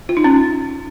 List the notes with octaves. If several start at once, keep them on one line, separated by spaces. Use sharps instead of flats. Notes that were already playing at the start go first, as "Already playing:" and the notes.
F4
D#4
C#4